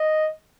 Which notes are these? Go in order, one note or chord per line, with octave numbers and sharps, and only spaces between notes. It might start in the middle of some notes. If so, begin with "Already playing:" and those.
Already playing: D#5